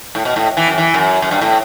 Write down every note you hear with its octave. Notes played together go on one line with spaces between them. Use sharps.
A2
B2
A2
E3
F#2
E3
F#2
F#2
G2
A2